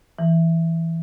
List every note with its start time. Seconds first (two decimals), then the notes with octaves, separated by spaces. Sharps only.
0.19 E3